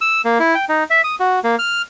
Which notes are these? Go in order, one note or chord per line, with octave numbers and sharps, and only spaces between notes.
E6
A#3
E4
G5
D#4
E5
D#6
F#4
A#3
F6